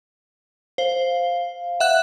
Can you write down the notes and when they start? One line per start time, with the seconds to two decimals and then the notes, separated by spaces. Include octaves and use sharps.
0.78 C5 F5
1.80 E5 F#5 F#6